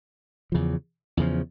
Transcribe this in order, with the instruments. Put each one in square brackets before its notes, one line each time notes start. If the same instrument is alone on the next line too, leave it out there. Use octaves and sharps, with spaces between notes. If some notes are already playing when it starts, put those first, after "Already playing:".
[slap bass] E2 C#3 F3
E2 C#3 F3